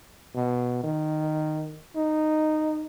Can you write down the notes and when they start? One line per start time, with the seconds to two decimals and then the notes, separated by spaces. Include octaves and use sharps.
0.35 B2
0.84 D#3
1.95 D#4